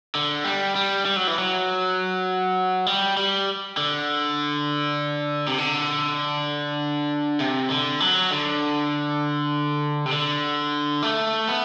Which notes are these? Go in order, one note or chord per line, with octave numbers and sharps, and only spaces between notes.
D3
G3
G3
G3
F#3
E3
F#3
G3
G3
D3
C3
D3
C3
D3
F#3
D3
C3
D3
A3
B3